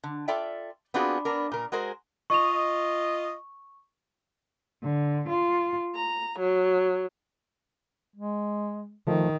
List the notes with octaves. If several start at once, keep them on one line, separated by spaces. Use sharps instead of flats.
D3
F4 A4 D5 E5 G5
B3 C4 D4 F4 F#4 G#4
B3 D4 A#4
A#2 A#4
G#3 F#4 G#4 A#4 C5
F4 D#5 C#6 F7
D3
F4
A#5
F#3
G#3
D#3 F3 A3